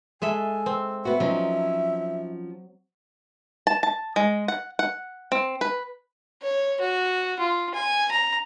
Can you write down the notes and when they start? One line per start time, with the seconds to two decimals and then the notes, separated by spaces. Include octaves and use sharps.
0.22 G#3 A4 E5 G#5
0.66 C4
1.05 B3 F#4 E5
1.20 F3 F#3 C#4 D#4
3.67 A5
3.83 A5
4.16 G#3
4.48 F#5
4.79 F#5
5.32 C4
5.61 B4
6.42 C#5
6.81 F#4
7.39 F4
7.74 G#5
8.11 A#5